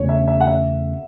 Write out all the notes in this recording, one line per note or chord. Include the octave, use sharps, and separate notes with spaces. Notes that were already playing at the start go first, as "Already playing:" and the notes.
Already playing: E2 C#3 A3 C#4 C#5
E5
E5
F#5
E5